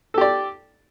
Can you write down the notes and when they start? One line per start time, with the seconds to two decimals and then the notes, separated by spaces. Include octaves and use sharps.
0.14 A4
0.18 G4
0.21 D5